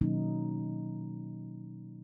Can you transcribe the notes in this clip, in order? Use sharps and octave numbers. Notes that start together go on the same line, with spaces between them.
B2 D#3 F#3 A#3 C#4 D#4